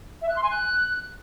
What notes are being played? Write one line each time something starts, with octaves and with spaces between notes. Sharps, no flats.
E5
F#6
C6
G#5
F#6